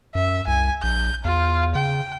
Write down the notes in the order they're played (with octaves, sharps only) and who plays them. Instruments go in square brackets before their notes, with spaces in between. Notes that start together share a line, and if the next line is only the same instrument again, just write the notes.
[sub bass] F#2 [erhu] E5
[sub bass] C2 [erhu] G#5
[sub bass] A#1 [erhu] G6
[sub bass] E2 [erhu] F4
[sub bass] C#3 [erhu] G5